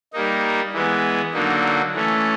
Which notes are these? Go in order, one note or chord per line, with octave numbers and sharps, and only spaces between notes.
G3 A#3 D#4
E3 G#3 B3
D3 F#3 A#3 D#4
E3 A3 C#4